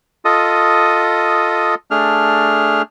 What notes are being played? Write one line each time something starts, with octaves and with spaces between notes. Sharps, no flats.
F4 A4 D#5 D#6
A3 D4 G#4 F6